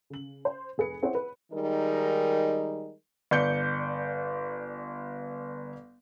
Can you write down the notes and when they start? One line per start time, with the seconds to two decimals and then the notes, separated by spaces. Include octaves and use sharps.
0.10 C#3 F#7
0.45 C5
0.78 F1 G#4 B4 C#7
1.03 C4 E4 G#4 C5 C#5 F#5
1.15 B4
1.52 D#3 G3 G#3 D#4 A#4
3.31 G1 D5 G6 C#7